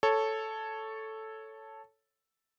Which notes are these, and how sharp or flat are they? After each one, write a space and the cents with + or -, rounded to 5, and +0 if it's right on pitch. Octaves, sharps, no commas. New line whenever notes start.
A4 +0 C#5 +0